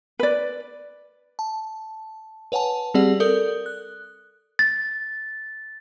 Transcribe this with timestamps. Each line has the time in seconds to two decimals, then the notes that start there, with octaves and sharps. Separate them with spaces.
0.19 B4 D5
1.39 A5
2.52 B4 C#5 F#5 G#5 A5
2.94 G3 C4 G4 G#4 D5 F#5
3.20 A4 A#4 D5 D#6 G6
3.66 F#6
4.59 A6